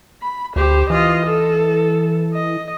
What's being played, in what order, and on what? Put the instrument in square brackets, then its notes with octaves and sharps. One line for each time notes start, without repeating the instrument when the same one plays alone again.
[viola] B5
[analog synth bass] D2 [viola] G4 C5
[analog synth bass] E3 [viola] F4 D#5
[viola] A4
D#5